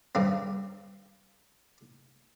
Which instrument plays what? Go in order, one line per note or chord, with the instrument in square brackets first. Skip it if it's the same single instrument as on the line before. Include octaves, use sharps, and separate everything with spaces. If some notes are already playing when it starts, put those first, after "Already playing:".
[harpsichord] G2 C#3 C4